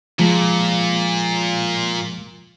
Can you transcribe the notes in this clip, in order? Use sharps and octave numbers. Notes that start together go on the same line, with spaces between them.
A#2 F3 G#3